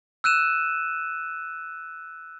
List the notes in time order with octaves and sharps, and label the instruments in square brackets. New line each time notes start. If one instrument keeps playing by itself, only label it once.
[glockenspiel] E6 F#6 D#7 E7